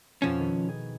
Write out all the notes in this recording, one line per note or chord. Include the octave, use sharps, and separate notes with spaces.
F2 B2 F3 C#4
D#3 E4 B4
G#4